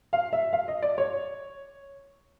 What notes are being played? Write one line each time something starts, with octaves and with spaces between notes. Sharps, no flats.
F5
E5
F5
D#5
D5
C#5